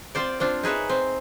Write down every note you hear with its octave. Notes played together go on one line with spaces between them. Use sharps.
C4 F4 C5 D5
C4 D4 F4
D#4 G#4 B4 C#5 E5
C4